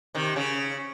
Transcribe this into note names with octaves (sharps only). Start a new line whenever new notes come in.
C3 D#3
C#3